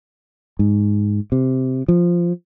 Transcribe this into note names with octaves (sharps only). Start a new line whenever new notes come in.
G#2
C3
F3